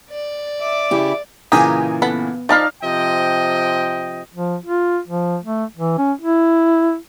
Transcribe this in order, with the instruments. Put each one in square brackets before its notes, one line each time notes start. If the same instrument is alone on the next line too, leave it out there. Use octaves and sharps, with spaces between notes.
[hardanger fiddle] D5
[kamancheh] E5 D6
[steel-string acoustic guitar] C#3 E4 G4
[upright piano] A#2 C#3 E3 [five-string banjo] G4 G#4 [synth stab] G#5 A#5 D#6
[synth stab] B3 [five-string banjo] A4 F#5 B5
[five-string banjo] F3 A5 B5 [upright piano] D#4 [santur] D5 F5
[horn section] C3 F3 D#5 G5
[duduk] F3
F4
F3
A3
E3
C#4
E4